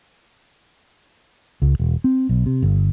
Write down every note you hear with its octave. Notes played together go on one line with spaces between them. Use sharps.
C#2
E1
C4
B1
C3
G1